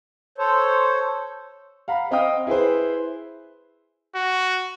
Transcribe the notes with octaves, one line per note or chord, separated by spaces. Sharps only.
A4 C5 C#5
F5 F#5 A#5 B5
C4 D#5 F5 G5 D#6
E4 G#4 B4 C5
F#4